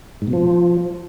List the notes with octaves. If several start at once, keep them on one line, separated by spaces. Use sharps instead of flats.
G#2
B2
F3